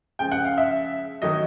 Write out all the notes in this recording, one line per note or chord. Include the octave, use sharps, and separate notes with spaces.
C#3 F3 G#3 G5
F#5
F5
E5
D#3 F#3 A3 D#5